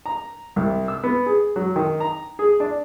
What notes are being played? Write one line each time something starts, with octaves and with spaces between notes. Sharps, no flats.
A#5
C2
E6
B3
G#4
F#3
D#3
A#5
G#4
D4